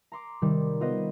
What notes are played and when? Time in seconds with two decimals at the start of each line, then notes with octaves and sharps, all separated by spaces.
0.12 A#5 C6 D6
0.42 C3 D#3 G3
0.81 B3 F4 B4 C5 D#5